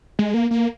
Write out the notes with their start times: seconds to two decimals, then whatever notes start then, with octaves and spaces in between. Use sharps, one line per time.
0.19 G#3
0.34 A#3
0.51 A#3